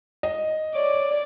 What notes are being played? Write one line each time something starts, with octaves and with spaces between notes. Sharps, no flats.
D#5
C#5 D5